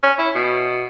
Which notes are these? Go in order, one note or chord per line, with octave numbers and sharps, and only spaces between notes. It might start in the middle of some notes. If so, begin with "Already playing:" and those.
C#4
E4
B2